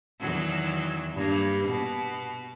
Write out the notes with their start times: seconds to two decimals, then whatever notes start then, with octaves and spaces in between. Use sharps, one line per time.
0.20 E2 D#3 F#3
1.14 G2 A#3
1.68 B2